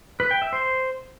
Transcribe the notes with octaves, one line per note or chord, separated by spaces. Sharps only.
B4
G5
E5
C5